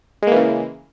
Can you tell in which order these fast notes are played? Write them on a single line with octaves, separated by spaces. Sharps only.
G#3 A#3 E3 C#3